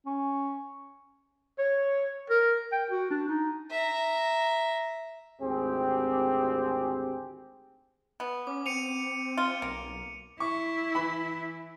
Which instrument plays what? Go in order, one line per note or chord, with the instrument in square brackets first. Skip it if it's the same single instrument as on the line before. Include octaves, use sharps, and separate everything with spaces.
[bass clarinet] C#4
[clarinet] C#5
A#4
G5
F#4
D4
D#4
[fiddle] E5 A#5
[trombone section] G#1 D2 C4 G4 G#4
[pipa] B3
[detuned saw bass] C#4 [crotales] D6
[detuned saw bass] C4 [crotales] C#7 D#7 F7
[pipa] F4
[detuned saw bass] B1 [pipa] A#3
[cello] E4 [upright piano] C#6
[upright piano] E3 B5